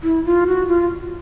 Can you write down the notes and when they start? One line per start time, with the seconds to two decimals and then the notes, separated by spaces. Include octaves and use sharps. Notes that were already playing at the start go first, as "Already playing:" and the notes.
0.04 E4
0.25 F4
0.47 F#4
0.68 F4